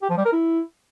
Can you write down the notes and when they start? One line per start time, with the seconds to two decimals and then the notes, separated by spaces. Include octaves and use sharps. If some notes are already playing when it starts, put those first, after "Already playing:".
0.02 G4
0.10 F3
0.17 G3
0.25 A#4
0.33 E4